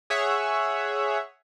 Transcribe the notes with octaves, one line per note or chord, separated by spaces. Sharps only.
G#4 C#5 E5 F#5